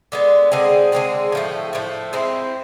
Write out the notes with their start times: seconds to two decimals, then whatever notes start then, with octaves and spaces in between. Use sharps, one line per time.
0.12 D3 G#3 B3
0.52 D3 G#3 C4 G#4
0.92 D3 G#3 C4 G#4
1.32 A2 F3 A3
1.73 A2 F3 A3
2.13 G#3 C4 E4